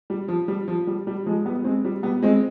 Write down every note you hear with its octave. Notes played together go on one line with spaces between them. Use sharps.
G3
F3
G3
F3
G3
G3
F3 G#3
G3 B3
G#3 C4
G3
G3 B3
G#3 C4